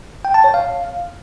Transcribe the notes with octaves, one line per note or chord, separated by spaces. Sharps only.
G5
A5
C#5
F5